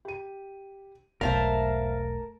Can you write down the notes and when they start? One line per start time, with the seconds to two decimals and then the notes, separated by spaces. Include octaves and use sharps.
0.05 G4 D#7
1.21 E1 B1 A3 A#4 C5 E5 F5 A5